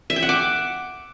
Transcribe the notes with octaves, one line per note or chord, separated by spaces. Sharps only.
E5
G5
F#5
D6